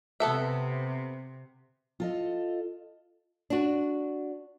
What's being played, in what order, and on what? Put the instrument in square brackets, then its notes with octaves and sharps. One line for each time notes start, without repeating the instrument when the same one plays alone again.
[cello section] C3 [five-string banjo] B3 A4 E5
[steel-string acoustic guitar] F4 A4 D#5
[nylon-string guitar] D4 F#4